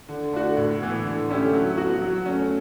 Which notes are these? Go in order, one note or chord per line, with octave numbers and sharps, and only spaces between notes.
D3
A3 D4 F#4
A2
E3 B3
D3
A3 C#4 E4 G4
F#3
B3 F#4
F#3
A3 C#4